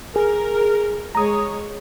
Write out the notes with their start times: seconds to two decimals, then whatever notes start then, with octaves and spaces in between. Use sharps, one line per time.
0.16 G#4 A#4
1.15 G#3 C#5 A#5 D#6